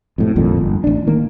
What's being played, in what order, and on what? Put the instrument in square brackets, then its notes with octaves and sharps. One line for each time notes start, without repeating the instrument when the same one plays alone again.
[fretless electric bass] F2 A2 C3
G#1 F2 A#2 D3
G1
A1 D4
D#3 A#3